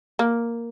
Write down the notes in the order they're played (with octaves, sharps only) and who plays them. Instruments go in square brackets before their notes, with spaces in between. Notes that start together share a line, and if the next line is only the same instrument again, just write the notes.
[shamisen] A#3